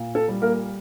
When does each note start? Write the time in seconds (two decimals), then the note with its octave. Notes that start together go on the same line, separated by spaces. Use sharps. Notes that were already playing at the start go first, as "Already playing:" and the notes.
Already playing: A#2
0.15 A4
0.28 G3
0.42 A#3 A#4